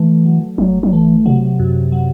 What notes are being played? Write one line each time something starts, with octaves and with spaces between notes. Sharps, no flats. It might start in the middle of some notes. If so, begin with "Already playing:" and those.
Already playing: E3 A3
F#3
G1 F#3
F#3
E3 A3
C3 F#3
F#2
F#3